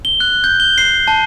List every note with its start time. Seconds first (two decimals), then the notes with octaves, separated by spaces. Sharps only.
0.05 G7
0.20 F#6
0.44 G6
0.60 G7
0.78 C7
1.08 A5